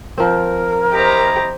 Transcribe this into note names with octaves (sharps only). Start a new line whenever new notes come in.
F3 C4 A#4
E4 G4 C5 D#5 A#5